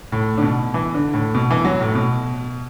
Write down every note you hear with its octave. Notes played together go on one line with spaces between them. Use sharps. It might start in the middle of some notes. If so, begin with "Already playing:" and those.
A2
D3
B2
E3
D3
A2
B2
E3
F#3
A2
B2